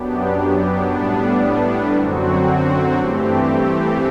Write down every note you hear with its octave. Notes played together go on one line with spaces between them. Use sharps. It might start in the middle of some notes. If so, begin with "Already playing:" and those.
Already playing: F#2 F#3 B3 D4 G4
A2 G3 B3 D4
F#2 D3 F#3 C4 F#4
G2 E3 A3 C4 G4